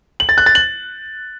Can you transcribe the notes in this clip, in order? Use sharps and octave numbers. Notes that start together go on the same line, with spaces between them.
F#7
A6
F#6
A6
F#7